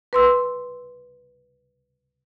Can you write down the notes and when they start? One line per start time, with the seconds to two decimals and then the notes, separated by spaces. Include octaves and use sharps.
0.13 B4 C6 E6